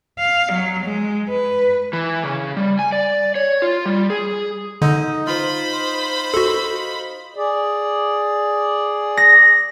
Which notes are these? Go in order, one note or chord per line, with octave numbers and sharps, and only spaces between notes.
F5
F#3
G#3
B4
E3
C#3
G3
G#5
D5
C#5
F4
G3
G#4
D3 D#4
F4 C5 B5
F#4 A4
G#4 D5
A#6